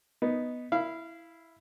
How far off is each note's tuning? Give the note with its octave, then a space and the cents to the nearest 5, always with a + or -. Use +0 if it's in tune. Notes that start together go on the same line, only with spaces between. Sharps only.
B3 +0 D#4 +0
E4 +0 F5 -25